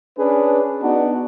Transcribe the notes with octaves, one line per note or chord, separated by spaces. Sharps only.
C#4 D4 G#4 B4
B3 D4 D#4 F#4